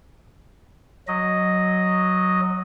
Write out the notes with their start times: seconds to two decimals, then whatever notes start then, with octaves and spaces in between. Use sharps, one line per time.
1.08 F#3 D#5